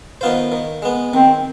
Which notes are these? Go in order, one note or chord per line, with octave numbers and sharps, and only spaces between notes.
D#3 B3 F4 C5
D#3
G#3 B3
D#3 C4